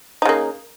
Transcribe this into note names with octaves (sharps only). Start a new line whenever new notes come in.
C#3 A#3 D#4